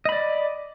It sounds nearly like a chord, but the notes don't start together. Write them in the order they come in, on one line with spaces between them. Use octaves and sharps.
D#5 B5 D5